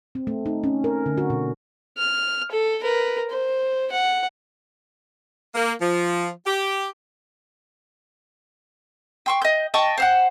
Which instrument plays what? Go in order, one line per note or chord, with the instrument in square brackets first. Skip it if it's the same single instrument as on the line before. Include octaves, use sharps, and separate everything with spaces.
[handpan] C4
A3
D#4
C#4
A#4
D3
F#4
B2
[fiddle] F6
A4
A#4 B4
C5
F#5
[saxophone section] A#3
F3
G4
[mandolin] G5 C6 C#6
D#5 G6
D#5 G5 A5 C#6
C5 F5 F#5